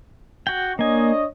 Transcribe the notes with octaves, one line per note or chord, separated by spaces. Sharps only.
F#4 G5
A#3 D4 C#5 D#5 G#5